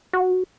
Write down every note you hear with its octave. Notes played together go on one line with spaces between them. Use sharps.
F#4